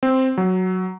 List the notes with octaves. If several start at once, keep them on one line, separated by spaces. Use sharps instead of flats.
C4
F#3